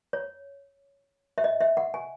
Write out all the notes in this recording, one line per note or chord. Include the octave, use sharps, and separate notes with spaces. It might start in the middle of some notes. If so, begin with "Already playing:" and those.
C#5
E5
D#5
E5
F#5
G#5